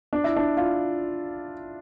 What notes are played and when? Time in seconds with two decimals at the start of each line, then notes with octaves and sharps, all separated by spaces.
0.13 D4
0.24 E4
0.37 D4
0.57 F4